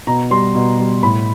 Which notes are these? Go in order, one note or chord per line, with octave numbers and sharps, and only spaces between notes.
B2 A#5
G3 C6
B2
G3
A2 B5